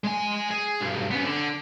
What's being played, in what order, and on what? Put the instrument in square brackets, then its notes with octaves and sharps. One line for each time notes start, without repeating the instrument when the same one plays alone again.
[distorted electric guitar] G#3 G#5
G#4
B1 G2
B3 C#4
D3